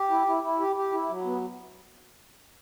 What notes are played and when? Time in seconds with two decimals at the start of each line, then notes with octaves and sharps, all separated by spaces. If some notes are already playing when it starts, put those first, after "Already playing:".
Already playing: G4
0.10 E4
0.26 E4
0.43 E4
0.59 G4
0.76 G4
0.92 E4
1.09 F#3
1.25 B3